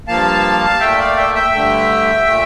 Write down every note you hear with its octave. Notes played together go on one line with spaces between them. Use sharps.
G2 F3 A#3 F5 A5
A#2 A3 E5 G5
D5 F5
E5 G5
E5 G5
G2 D3 A3
A#2 A3